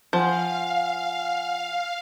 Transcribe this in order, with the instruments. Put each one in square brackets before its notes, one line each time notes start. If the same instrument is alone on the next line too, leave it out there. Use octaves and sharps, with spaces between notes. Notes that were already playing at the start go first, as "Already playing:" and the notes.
[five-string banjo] F3 [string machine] F5 [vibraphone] F#5 G#5